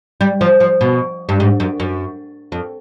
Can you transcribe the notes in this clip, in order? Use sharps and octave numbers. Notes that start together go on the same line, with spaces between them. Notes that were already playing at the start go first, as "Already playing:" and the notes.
G3
F3
F3
B2
G2
G#2
F#2
F#2
F2